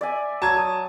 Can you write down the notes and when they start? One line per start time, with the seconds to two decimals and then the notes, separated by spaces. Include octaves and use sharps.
0.01 D5 E5 G#5
0.42 F#3 A5 G#6
0.57 D#6